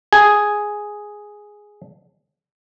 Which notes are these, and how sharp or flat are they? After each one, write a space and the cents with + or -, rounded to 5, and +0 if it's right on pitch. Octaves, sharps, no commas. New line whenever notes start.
G#4 +0 G#5 +0